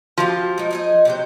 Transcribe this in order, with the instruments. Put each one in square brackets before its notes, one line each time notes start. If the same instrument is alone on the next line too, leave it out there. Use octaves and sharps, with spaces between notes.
[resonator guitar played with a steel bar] F3 [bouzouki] F#4 G4 F5
[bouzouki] G#3 D#4
D#4 G#4 D#5
C3 F#3 C5